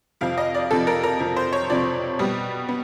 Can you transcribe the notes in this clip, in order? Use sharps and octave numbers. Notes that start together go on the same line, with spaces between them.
F2 C3 F3 F5
D#5
D5
F2 C3 F3 A4
A#4
A#4
F2 C3 F3
C5
C#5
F2 C3 F3 D5
B2 G3 B3
B3